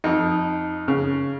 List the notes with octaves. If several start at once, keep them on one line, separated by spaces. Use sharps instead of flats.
F2 D#4
C#3